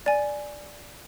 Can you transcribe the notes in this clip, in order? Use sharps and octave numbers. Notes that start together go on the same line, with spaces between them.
D5 G#5